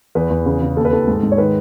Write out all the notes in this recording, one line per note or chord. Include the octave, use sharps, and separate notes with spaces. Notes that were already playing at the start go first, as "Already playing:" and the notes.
E2 B4
E2
C#3
C#3
D#2 A4
B4
D#2 A4
G#2
G#2
C#5
D#3 B4